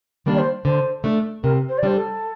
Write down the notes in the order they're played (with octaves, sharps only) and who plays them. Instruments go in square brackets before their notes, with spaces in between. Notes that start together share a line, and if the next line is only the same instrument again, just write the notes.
[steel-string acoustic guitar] D#3 G3 A#3 D4
[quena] D5
C5
[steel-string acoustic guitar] D3 [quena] C5
[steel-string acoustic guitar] A3 D4
[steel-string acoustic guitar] C3 [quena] A#4
[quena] C5
D5
[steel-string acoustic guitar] G3 D4 [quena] C5
[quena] A4